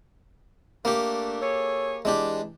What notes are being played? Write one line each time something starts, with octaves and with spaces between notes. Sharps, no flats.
A3 A#3 D4 G4
G#4 A4 C#5
E3 G#3 D4 G4